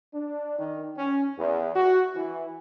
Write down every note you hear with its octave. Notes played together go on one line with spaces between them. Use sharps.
D4
D#3
C#4
E2
F#4
E3